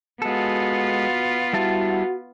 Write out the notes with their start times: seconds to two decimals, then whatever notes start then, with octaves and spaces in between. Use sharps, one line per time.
0.22 G#3 B3 F4 F#4 A4
1.53 G3 E4 F#4 A5